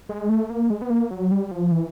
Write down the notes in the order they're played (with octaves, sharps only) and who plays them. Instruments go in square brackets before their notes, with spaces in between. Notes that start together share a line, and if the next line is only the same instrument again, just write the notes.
[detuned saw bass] G#3
A3
A#3
G#3
B3
A#3
F#3
G3
F3
E3